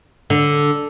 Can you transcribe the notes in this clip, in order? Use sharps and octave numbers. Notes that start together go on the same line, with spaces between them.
D3